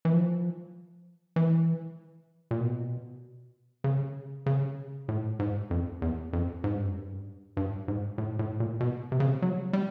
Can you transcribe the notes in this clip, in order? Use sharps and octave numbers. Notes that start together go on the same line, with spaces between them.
E3
F3
E3
A#2
B2
C#3
C#3
A2
G#2
F2
E2
F2
G#2
G2
F#2
G2
G2
G#2
A2
A2
A#2
B2
C3
C#3
C3
F#3
G3